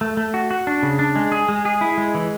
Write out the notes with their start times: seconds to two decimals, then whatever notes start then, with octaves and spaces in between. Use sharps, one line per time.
0.01 A3
0.17 A3
0.34 F#4
0.51 F#4
0.67 D4
0.83 C#3
0.99 D4
1.16 G#3
1.32 G#4
1.49 G#3
1.65 G#4
1.81 E4
1.98 G#3
2.15 E3